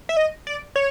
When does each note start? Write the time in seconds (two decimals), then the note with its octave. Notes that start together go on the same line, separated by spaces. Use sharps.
0.09 E5
0.17 D#5
0.47 D5
0.76 C#5